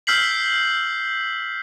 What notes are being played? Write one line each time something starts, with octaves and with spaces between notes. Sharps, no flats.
E6 F6 G6 B6 C7 F#7